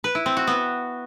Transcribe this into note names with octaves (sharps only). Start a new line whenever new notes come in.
B4
E4
C4
F#4
B3